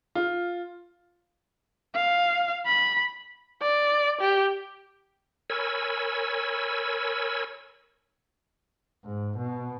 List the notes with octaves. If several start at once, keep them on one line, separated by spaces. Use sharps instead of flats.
F4
F5
B5
D5
G4
A#4 C#5 G#5 B5 E6
G#2
B2